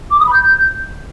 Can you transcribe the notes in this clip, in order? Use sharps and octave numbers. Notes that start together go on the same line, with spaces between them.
D6
D#6
B5
G6